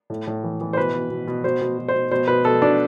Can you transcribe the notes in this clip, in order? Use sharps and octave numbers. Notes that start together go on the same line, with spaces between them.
A2
A2
E3
E3
C5
B2 B4
B2
B2
B2
B2 C5
B2
B2
C5
B2
B2 C5
B2 B4
B2 A4
B2 D4